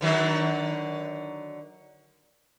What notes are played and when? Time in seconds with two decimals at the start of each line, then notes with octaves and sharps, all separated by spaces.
0.01 D3 D#3 F#3